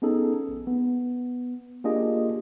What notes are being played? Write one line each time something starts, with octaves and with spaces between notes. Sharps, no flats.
B3 C#4 D#4 G#4 A4
A#1
B3
A#3 D4 F4 G4 G#4 D#5